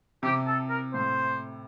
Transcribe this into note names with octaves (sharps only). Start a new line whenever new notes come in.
C3 G4
A4
A#4
A2 C5